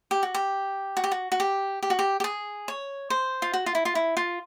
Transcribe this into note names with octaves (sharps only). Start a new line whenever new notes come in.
G4
F#4
G4
F#4
G4
F#4
F#4
G4
G4
F#4
G4
G4
G#4
C#5
C5
F4
F#4
F4
E4
F4
E4
F4